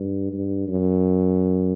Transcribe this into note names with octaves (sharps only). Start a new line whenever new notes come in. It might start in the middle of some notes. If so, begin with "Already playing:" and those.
Already playing: G2
G2
F#2